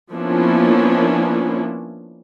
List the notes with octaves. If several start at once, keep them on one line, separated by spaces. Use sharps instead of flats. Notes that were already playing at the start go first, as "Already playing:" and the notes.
F3 A#3 B3 C#4 D4 E4